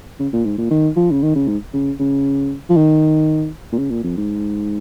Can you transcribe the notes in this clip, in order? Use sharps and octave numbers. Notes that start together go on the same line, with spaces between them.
C#3
A#2
G#2
A#2
D#3
F3
C#3
D#3
C#3
G#2
C#3
C#3
F3
D#3
A#2
C#3
A#2
F2
G#2